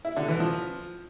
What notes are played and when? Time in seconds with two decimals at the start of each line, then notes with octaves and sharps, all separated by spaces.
0.05 E4
0.16 D3
0.28 E3
0.40 F3